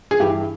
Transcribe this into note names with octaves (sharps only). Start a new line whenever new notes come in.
G#4
G2 E3 G4